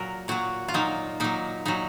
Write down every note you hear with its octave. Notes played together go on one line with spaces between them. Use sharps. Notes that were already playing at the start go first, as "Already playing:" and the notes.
Already playing: A#2 F#3 F#4 A#4
A#2 F#3 F#4
F4
A#2 F#3 D#4
A#2 F#3 D#4
A#2 F#3 D#4